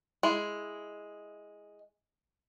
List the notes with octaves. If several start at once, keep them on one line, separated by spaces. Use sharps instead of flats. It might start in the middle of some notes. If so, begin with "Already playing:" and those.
G#3 E4